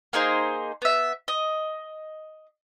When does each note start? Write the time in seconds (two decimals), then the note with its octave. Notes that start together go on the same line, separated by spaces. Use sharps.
0.13 A#3 D#4 G#4 C5
0.82 B3 E5
1.28 D#5